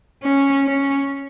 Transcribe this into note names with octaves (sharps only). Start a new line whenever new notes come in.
C#4
C#4